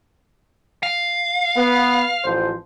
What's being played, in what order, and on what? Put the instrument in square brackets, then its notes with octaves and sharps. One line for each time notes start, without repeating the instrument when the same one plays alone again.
[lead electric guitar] F5
[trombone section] B3
A1 F3 C5